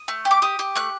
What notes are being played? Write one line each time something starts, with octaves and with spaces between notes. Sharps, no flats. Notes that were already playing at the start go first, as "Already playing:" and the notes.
Already playing: D#6
A3
G4
D6
G4 D#6
G4
A3 F#6